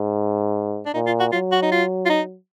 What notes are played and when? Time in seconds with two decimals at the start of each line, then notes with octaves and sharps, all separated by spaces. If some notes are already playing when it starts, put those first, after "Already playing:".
Already playing: G#2
0.86 D4
0.94 A#2 D#4
1.06 F4
1.20 F#4
1.32 F#3 F4
1.52 F#4
1.62 D#4
1.72 F4
2.06 F4
2.09 D#4